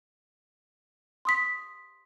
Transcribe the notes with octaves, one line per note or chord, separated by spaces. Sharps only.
C6 D#6 B6